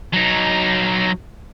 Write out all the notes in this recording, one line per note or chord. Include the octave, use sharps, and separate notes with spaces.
F#3 D#4